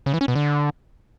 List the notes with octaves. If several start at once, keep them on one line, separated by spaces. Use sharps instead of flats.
C#3
E3
C#4
B2
D3